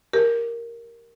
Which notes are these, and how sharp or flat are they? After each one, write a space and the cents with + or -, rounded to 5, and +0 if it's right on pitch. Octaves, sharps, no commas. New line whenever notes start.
G4 +0 A#4 +0